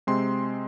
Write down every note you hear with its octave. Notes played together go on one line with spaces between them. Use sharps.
C3 G#3 C4 C6